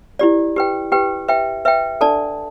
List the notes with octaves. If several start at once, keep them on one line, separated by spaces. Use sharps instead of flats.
E4 G4 D5
G4 B4 G5
G4 B4 G5
B4 E5 G5
B4 E5 G5
D4 A4 D5 A5